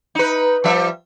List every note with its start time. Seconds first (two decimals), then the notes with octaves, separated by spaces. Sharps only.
0.15 D#4 B4
0.64 F3 G3 E5